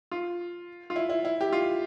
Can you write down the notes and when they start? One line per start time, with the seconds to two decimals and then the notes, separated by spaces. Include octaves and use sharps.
0.11 F4
0.90 F4
0.96 E4
1.10 E4
1.25 E4
1.41 G4
1.52 F4